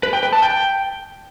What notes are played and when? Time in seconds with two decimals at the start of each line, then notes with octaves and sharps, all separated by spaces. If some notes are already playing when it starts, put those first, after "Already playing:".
0.03 B4
0.13 G5
0.23 B4
0.33 A5
0.42 G5